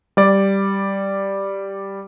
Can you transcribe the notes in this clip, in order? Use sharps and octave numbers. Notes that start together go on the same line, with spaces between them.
G3 D5